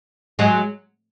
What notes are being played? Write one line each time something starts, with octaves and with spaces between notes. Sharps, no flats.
F#3 G#3